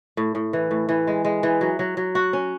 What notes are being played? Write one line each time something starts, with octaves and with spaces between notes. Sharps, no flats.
A2
A2
E3
A2
E3
G#3
G#3
E3
F#3
F#3
F#3
F#4
C#4